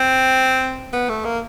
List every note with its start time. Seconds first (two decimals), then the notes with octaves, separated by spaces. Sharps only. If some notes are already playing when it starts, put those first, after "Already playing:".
Already playing: C4
0.93 B3
1.09 A3
1.25 A#3